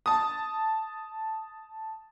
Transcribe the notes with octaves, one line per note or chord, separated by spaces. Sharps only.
A5 D#6